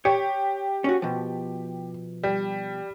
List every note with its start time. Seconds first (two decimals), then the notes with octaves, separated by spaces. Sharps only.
0.05 G4 C#5
0.84 C#4 F#4
1.02 B2 F3
2.23 G3